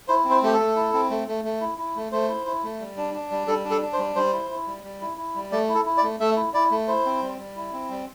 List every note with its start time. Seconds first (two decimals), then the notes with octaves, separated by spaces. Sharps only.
0.08 E4 C5
0.25 C4
0.30 C5
0.43 A3 G4
0.53 A4
0.59 A3
0.76 E4
0.94 C4
1.10 A3
1.28 A3
1.44 A3
1.61 E4
1.78 E4
1.96 A3
2.12 A3 C5
2.28 E4
2.46 E4
2.64 A3
2.80 G3
2.97 D4
3.14 D4
3.31 G3
3.47 G3 A4
3.65 D4
3.71 A4
3.82 D4
3.93 C5
3.99 G3
4.15 G3 C5
4.33 E4
4.50 E4
4.67 G3
4.84 G3
5.01 E4
5.18 E4
5.35 G3
5.52 A3 D5
5.69 E4
5.74 A4
5.86 E4
5.97 D5
6.03 A3
6.20 A3 E5
6.37 E4
6.54 E4 D5
6.71 A3
6.87 E4 C5
7.06 C4
7.22 G3
7.38 G3
7.56 E4
7.73 C4
7.90 G3